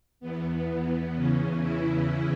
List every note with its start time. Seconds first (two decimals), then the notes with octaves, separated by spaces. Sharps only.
0.20 E2 E3 B3
1.15 E2 C#3 E3 C#4
1.61 E4